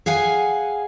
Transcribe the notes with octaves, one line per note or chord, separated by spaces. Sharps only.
G#4 F5 F#5 G#5